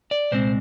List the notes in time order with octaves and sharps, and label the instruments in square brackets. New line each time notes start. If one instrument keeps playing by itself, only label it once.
[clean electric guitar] D5
C2 A#2 G#3 C4 C5